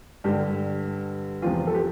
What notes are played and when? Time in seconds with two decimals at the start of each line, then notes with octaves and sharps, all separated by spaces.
0.24 G2 D3 G3 G4
1.42 E2 C3 F3 F4
1.67 A4
1.74 G4